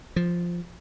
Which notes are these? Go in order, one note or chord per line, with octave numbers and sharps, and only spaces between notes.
F3